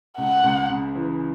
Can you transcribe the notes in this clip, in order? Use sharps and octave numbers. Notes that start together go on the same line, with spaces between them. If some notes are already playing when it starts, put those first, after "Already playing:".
C#2 F#5
C#2
C#3
E3